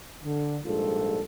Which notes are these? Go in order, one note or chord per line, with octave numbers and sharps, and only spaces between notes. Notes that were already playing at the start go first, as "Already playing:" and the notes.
D3
A#1 G#2 G3 F4 A4